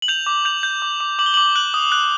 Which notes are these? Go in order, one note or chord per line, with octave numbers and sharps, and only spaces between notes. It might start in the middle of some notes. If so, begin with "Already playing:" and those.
F#7
G6 F7
D6
G6 F7
G6
D6
D6
D6 F#7
G7
D6 F#7
F#6 F#7
D#6
F#6